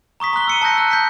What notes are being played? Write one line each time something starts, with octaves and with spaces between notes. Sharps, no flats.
A#5 C#6 D#6 B6
A#5 C6 F#6 G7
E6 C#7 D#7
A5 D#6 E6 F#6 G6 A#6
F#6
G6 B6